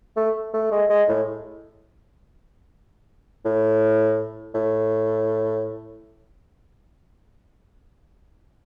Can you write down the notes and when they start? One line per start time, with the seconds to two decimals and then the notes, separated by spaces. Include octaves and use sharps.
0.17 A3
0.54 A3
0.71 G#3
0.90 G#3
1.08 A2
3.45 A2
4.54 A2